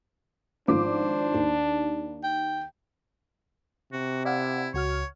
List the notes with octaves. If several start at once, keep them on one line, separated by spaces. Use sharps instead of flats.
G#1 F3 D4 C5 D6
D#2
G5
C3 F#4
E4 D5 F5 F#5
C#2 F#4 C#5 F6